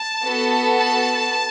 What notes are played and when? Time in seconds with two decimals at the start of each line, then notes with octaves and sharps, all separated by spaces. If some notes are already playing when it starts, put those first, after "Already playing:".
Already playing: A5
0.24 B3 F#4 A4
0.79 A5